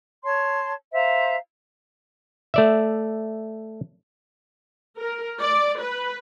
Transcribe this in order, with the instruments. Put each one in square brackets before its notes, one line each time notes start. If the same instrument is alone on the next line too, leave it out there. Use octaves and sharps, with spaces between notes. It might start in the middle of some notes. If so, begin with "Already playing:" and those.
[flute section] C#5 A5 C6
C5 E5 F5 A#5
[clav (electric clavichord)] A3 D5 E5
[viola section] A#4
D5
B4